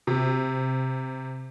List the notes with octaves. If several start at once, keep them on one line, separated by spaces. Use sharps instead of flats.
C3